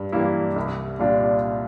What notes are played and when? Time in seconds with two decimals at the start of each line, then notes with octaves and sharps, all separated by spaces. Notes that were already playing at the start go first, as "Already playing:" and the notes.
Already playing: G2
0.12 E3 G3 A#3 E4
0.56 C2
0.99 A#2 G3 D4 F4